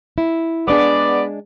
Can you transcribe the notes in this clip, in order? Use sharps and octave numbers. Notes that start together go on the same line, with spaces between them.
E4
G#3 B3 D4 G#4 D5